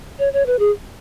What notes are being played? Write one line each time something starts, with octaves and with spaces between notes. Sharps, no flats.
C#5
C#5
B4
G#4